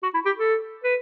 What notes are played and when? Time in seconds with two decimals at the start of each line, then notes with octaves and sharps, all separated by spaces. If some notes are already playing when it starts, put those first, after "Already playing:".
0.03 F#4
0.14 E4
0.25 G4
0.37 A4
0.84 B4